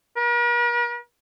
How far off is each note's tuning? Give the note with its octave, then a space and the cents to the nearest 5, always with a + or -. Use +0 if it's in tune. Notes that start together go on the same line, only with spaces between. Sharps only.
A#4 +45